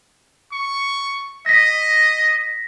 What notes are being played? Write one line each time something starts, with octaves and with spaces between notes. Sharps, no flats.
C#6
D#5 A#6 B6